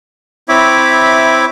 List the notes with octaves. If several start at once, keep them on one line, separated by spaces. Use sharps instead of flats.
C4 E4 C#5 E5 B5 D6